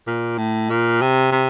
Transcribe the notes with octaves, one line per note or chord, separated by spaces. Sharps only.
A#2
A2
A#2
C3
C3